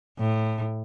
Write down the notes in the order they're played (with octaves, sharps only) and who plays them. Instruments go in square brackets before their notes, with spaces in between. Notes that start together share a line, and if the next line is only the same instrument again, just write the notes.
[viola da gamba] A2